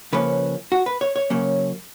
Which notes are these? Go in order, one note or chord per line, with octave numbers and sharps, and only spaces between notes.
C#3 F3 A#3 C#4 B4
F#4
B4
C#5
C#5
C#3 F#3 A#3 C#4